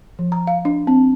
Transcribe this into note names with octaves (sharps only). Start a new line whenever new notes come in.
F3
A#5
F5
D4
C4